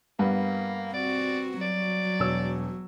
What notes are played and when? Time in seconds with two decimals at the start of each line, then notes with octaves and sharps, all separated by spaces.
0.19 G2 A#3 B3
0.94 C4 F#4 D5
1.62 F#3 D5
2.19 E1 C#5 E6